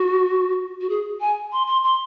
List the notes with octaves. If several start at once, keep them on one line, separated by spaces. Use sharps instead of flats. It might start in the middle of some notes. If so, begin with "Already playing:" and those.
Already playing: F#4
F#4
G#4
G#5
C6
C6
C6